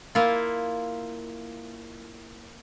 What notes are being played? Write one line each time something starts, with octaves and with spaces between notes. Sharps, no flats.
A#3 E4 F4